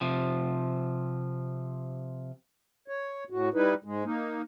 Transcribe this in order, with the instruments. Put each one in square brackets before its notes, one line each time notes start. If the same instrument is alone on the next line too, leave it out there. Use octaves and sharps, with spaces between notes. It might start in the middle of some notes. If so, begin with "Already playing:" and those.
[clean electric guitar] C3 F3
[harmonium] C#5
A2 F#4
G3 D#4 E4 B4
G#2 G#3
A#3 D#4